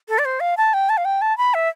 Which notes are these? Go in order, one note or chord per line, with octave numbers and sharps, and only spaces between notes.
A4
D5
C5
F5
A5
G5
A5
F5
G5
A5
B5
E5